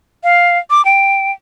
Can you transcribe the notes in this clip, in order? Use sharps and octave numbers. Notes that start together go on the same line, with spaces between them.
F5
D6
G5